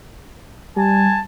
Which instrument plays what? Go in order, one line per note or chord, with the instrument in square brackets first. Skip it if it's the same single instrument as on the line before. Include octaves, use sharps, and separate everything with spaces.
[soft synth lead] G3 [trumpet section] G#5 A5